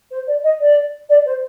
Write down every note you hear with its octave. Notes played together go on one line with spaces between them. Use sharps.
C5
D5
D#5
D5
D5
C5